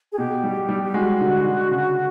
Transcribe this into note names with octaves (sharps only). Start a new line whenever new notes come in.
G#4
B2 G4
G3
G3
G4
G#3 F#4
D3
D3
C#3